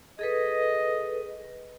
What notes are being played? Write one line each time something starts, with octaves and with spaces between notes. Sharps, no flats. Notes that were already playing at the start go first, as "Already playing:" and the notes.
G#4 A4 B4 D#5